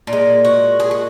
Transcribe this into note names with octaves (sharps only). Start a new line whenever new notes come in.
A#2
G#3
F#4
G#4
F#4